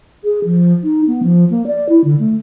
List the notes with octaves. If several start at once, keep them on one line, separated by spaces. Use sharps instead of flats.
G#4
F3
D#4
B3
F3
A#3
D5
E4
D3
A3